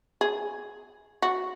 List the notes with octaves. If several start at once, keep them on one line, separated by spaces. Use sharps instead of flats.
G#4
F#4